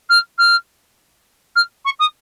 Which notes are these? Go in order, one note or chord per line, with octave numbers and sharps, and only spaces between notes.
F6
F6
F6
C#6
D#6